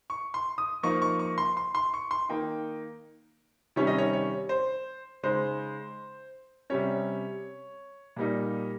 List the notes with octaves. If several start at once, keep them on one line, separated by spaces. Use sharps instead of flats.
C#6
C6
D#6
F3 A#3 D#4 C#6
C#6
C#6
C6
C6
C6
C#6
C6
D#3 A#3 D#4 G5
C3 D#3 G3 C#4 C#5
D#5
C#5
C#5
C5
C#3 G#3 D#4 C5
C3 G3 C#4 C#5
A#2 G3 A#3 D#4